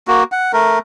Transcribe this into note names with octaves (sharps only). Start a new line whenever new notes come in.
A#3 F#4
F#5
A3 A#4